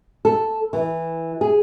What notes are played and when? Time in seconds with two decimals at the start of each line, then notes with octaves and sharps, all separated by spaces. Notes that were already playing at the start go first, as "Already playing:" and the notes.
0.25 A4
0.73 E3
1.41 G#4